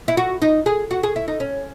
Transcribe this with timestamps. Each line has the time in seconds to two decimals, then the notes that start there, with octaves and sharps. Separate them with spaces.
0.08 E4
0.17 F#4
0.42 D#4
0.66 G#4
0.91 F#4
1.03 G#4
1.16 E4
1.28 D#4
1.40 C#4